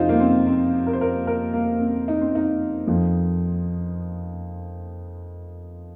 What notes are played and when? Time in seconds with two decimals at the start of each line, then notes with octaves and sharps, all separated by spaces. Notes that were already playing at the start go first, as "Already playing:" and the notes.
Already playing: F2 C3 F3 D#4 F4 C5
0.09 A#3
0.20 C4
0.47 C4
0.87 A#4
0.93 C5
1.01 A#4
1.27 A#4
1.53 A#3
1.80 C4
2.08 D#4
2.21 C4
2.35 D#4
2.87 F2 F3